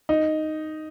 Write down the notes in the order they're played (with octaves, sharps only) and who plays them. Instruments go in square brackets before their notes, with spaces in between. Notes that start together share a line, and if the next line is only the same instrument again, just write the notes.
[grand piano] D#4